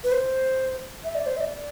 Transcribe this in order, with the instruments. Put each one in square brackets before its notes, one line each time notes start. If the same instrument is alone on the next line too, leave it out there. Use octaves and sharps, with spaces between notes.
[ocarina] B4
C5
E5
D5
C5
E5
D5